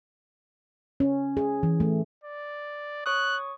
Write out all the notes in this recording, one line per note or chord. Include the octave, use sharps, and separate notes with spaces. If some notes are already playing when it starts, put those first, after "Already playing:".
C#4
G#4
E3
A3
D5
C#5 C#6 D#6 F#6